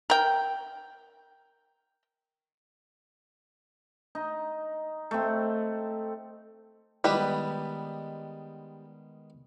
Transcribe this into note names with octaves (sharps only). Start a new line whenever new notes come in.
A#4 G5
D#4
A3 C4
D#3 G3 G#3 B3 B4